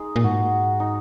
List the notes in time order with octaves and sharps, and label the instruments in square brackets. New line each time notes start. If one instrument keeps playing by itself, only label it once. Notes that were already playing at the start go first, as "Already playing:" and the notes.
Already playing: [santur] G#3 D#4 G#4
[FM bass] A#2
[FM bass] G#2 [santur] F#4
[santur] D#4